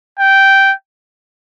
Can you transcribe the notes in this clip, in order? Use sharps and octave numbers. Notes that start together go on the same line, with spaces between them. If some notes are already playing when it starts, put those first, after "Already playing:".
G5